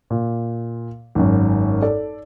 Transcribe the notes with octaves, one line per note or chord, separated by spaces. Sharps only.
A#2
G#1 F#2
A4 D5